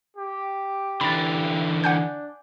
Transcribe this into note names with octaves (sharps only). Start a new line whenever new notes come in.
G4
D3 E3 B5 A6
D4 F#5 G#5 G6